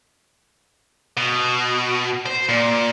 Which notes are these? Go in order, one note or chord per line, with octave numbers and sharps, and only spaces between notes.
B2
C5
A#2